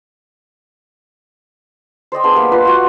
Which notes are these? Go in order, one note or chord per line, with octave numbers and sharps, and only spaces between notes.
C5 D5 D#5 G5
B3 D4 G#4
G3 A#3
F4 B4 D#5 C6
F4 F#4